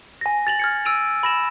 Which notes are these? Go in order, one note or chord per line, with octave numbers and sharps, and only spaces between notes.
G#5 A#6
A6 F7 F#7
F6 G#6 C#7
E6 D7 D#7 F7
B5 A#6 E7